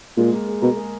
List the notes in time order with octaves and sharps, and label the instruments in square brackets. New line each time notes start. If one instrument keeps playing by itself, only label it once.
[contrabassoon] A#2 [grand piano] G#3
[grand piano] A#3
G#4
[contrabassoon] B2 [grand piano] A#4
[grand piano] G#4